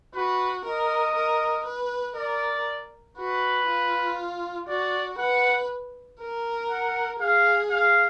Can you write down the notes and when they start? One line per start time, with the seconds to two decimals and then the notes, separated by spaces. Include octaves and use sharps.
0.15 F#4 B4
0.65 A#4 D#5
1.15 A#4
1.66 B4
2.16 A#4 D5
3.17 F#4 B4
3.67 F4
4.68 F#4 D5
5.18 B4 F#5
6.20 A#4
6.70 F#5
7.20 G#4 F5
7.71 F5